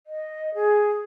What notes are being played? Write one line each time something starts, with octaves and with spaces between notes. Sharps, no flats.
D#5
G#4